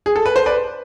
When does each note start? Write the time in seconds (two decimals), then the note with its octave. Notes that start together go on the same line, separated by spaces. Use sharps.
0.06 G#4
0.16 A4
0.26 B4
0.36 C5
0.46 B4 D5